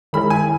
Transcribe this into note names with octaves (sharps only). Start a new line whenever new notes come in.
D#3 G#3 C#4 E4 A#4 B5
G#5